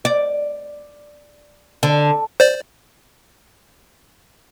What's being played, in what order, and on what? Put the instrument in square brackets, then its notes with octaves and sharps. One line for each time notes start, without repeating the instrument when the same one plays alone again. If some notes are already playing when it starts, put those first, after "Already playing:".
[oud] D5
D3
[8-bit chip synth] C5 D5